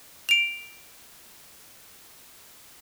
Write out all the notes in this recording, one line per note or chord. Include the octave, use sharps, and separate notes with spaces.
D7 F7